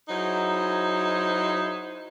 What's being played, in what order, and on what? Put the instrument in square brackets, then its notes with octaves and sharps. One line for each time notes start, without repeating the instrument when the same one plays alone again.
[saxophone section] F#3 D#4 E4 G#4 C5